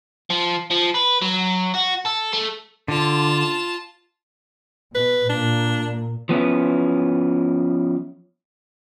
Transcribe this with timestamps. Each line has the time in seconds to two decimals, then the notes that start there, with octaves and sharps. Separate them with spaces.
0.30 F3
0.70 F3
0.94 B4
1.22 F#3
1.75 F#4
2.06 A4
2.33 A3
2.88 D3 F4 A5
4.95 B2 B4
5.29 A#2 A#3 D4
6.29 F3 B3 C#4 E4